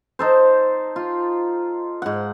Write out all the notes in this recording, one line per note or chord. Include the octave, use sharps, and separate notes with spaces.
D#4 A4 C5
F4
G#2 F#5